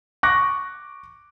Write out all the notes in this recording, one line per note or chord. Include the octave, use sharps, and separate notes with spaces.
C#6 D6 F#6 A#6